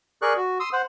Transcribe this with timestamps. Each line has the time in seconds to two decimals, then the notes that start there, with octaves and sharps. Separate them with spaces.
0.22 G#4 A#4 D5 C#6 F#6
0.36 F#4
0.60 C6 D#6 E6
0.73 C5 F#5